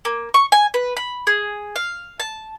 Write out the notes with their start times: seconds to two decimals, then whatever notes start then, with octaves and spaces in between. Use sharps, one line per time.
0.05 A#3
0.34 C#6
0.52 G#5
0.74 B4
0.97 B5
1.27 G#4
1.76 F5
2.20 A5